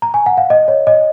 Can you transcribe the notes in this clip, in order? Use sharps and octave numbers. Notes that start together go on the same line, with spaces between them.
A#5
G#5
F#5
F5
D#5
C#5
D#5